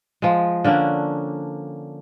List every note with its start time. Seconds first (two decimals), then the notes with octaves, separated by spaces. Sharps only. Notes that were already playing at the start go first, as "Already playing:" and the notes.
0.22 F3 G#3
0.64 D3 A#3 C#4 D4